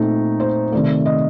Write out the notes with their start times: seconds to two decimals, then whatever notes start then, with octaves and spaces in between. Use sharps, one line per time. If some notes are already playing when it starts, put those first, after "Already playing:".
Already playing: A#2 A3 C4 D#4 A4
0.40 C5
0.72 C3 D#3 A3 D5
1.05 D#5